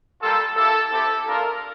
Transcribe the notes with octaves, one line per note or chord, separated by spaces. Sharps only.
G3 A#3 F4 A4
A#3 E4 G4 A4
C4 E4 G4 A4
A#3 D4 F4 A#4